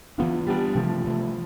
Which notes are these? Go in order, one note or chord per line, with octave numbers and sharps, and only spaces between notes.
E3 B3 D4 F4
E3 G3 B3 D4
C3 E3 F3 A3
C3 E3 A3